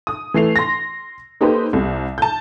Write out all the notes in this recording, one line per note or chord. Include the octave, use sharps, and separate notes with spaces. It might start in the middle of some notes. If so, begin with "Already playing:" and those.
D#6
E3 A3 C7 F7
C6 A#6
A#3 D#4 G4 A4 B4 C5
C2 C3
A5 G6